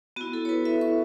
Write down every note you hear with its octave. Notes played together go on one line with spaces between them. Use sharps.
B3 E4 F#4
A4
C#5
B4
E5
C#6